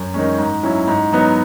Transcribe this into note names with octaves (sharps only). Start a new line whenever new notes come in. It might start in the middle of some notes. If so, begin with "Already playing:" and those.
Already playing: F#2
D#3 G#3 C#4
G#2
F#3 C#4 E4
G#2
F#3 B3 D#4